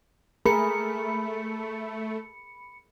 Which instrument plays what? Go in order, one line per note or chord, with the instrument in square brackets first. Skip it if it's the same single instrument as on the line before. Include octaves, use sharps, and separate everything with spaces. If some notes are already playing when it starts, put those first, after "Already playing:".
[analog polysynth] A3 [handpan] G#4 A#4 [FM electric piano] B5 C#7